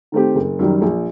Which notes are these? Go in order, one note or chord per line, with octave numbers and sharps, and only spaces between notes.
D#3 A3 C4 G4
F#1
F#2 D#3 G3
A#1